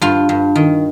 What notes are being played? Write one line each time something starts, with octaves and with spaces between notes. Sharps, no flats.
G2 F4
G2
D#3